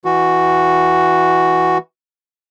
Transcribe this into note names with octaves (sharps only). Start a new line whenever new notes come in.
E3 F#4